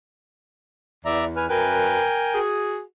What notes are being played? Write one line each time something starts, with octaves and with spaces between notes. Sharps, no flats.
E2 D5 E5 A#5
B4 G#5 F6
F#2 A#4 B4 G5 G#5
F#4 G#4